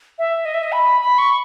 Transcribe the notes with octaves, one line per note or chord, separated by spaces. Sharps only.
E5
D#5
E5
D#5
B5
B5
C#6